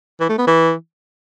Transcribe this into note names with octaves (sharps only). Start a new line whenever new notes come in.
E3
A3
B3
E3